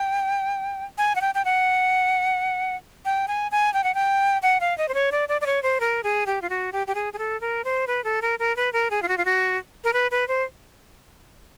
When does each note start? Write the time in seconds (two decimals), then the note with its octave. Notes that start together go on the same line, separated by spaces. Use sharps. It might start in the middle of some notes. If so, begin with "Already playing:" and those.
Already playing: G5
0.98 G#5
1.15 F#5
1.21 G5
1.35 G5
1.45 F#5
3.05 G5
3.28 G#5
3.52 G#5
3.74 G5
3.84 F#5
3.95 G5
4.42 F#5
4.60 F5
4.78 D#5
4.88 C5
4.94 C#5
5.12 D5
5.29 D5
5.41 D5
5.46 C#5
5.63 C5
5.80 A#4
6.04 G#4
6.26 G4
6.42 F4
6.50 F#4
6.73 G4
6.87 G4
6.95 G#4
7.13 G#4
7.18 A4
7.41 A#4
7.64 C5
7.87 B4
8.04 A4
8.22 A#4
8.39 A#4
8.57 B4
8.73 A#4
8.91 G#4
9.02 F4
9.08 F#4
9.18 F4
9.25 F#4
9.84 A#4
9.93 B4
10.11 B4
10.28 C5